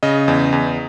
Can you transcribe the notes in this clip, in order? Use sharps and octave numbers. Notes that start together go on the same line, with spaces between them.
C#3 D#5
E2
E2